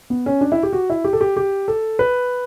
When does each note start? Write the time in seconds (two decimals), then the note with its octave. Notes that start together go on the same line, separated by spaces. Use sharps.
0.10 B3
0.26 C#4
0.41 D4
0.52 E4
0.63 G4
0.73 F#4
0.90 E4
1.04 G4
1.13 A4
1.21 G4
1.37 G4
1.68 A4
1.99 B4